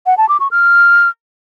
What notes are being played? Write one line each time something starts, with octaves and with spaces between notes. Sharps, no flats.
F#5
A5
D6
C#6
F6